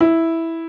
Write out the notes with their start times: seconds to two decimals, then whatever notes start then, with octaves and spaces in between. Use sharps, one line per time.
0.01 E4